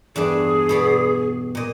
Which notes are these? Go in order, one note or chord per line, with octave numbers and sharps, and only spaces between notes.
E2 G2 D4 G#4
B2 B3 D5
A#2 D#5